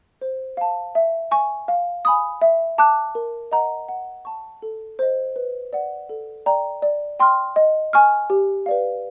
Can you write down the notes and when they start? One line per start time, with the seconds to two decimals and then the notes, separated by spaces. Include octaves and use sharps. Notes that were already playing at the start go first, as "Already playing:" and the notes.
0.21 C5
0.57 F5 A5
0.95 E5
1.31 G#5 C#6
1.68 F5
2.05 G#5 B5 D#6
2.42 E5
2.78 A5 D6 F#6
3.15 A#4
3.52 D#5 F#5 A#5
3.89 F#5
4.25 A5 C#6
4.62 A4
4.99 C5 D#5
5.36 B4
5.73 D5 F#5
6.09 A4
6.46 D5 G5 A#5
6.82 D5
7.19 G5 C6 F6
7.56 D#5
7.93 G#5 C#6 F6
8.30 G4
8.66 B4 D5 F5